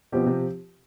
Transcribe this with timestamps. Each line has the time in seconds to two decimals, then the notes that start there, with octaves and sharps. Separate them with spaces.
0.12 B2 F3 C4 G4
0.26 C3